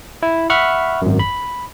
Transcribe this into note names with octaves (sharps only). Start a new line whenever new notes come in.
E4
E5 F#5 B5 C#6 F6
G#1 F#2
B5